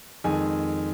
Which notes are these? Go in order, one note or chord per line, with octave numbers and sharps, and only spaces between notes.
F2 D#3 G#3 G#4 G#5